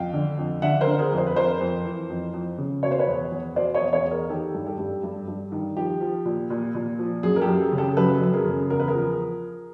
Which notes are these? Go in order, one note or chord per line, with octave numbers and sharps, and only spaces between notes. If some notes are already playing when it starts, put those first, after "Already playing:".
Already playing: F2 F5 G5
D3
F2
D3 E5 F#5
A#4 C5
D3
G#4 A#4
F2
C5
B4
F2 A#4 C5
F2
E3
F2
F2
C#3
B2 C#5
C5
B4 C#5
E2
E2
B2 C5 D5
C#5 D#5
E2
C#5 D#5
E2
G#4 A#4
D#3 G4 A4
G2
G4 A4
G2
G2
G2
D#3
F3 G4
F3
A#2
A#2
A#2
F3
F#2 G#4
A#4
G4 A4
F#2
G#4
C#3
G4 A4
F#2 A4 B4
F#2
G#4 A#4
C#3
E2 A#4
B4
G#4 A#4
F3